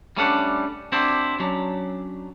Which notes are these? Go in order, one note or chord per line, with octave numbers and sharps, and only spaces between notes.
G3 A3 C#4 D4 D5 F#5
C4 D4 E4 F#4 C5 D5
F#3 C#4 D4